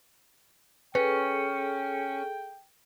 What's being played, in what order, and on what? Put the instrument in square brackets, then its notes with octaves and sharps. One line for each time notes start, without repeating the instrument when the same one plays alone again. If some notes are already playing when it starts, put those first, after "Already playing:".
[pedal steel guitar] C#4 [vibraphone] G#4 A4 [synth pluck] B4 [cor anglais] G5